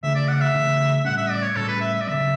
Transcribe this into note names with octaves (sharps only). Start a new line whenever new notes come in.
C#3 E3 A3 D4 E5
D5
F#5
E5
C#3 E3 A3 D4
A2 G3 C#4 F#5
E5
D5
C#5
A2 G3 C#4 A4
B4
E5
E5
D5
C#3 F#3 B3 E5